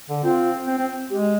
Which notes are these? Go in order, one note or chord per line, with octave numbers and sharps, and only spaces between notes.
D3
C4 F4
C4
C4
G#3 G4